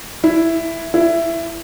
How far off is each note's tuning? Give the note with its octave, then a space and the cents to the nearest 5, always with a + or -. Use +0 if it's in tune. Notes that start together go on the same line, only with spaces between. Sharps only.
E4 +5
E4 +15